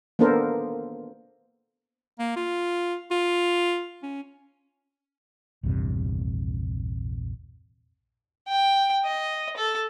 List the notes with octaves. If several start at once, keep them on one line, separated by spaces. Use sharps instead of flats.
A#3 B3 D4 A4 A#4 C5
A#3
F4
F4
C#4
A#1 E2 G2 C3
G5
D#5
A4